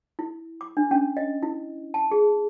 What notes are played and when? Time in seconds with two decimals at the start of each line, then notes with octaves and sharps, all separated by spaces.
0.19 E4
0.61 D6
0.77 D4
0.91 C#4
1.17 D#5
1.43 E4
1.94 A5
2.11 G#4